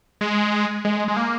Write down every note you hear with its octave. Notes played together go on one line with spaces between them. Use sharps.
G#3
G#3
G#3
A#3